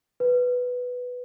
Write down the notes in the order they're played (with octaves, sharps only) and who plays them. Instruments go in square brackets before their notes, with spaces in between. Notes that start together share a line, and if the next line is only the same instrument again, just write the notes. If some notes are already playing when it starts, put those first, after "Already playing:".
[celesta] B4